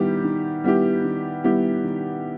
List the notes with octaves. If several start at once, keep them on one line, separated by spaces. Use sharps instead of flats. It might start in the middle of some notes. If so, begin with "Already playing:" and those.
Already playing: D#3 G3 B3 E4 G4
D#3
G3 B3 E4 G4
D#3
G3 B3 E4 G4
D#3